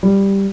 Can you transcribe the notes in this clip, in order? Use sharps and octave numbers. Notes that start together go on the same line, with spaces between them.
G3